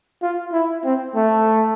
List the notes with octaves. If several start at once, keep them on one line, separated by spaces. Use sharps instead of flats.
F4
E4
C4
A3